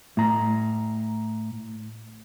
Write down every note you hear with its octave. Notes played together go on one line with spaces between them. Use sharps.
A2 A#5